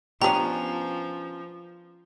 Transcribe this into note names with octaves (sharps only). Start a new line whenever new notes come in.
F3 B3 C#4 D4 G4 A#5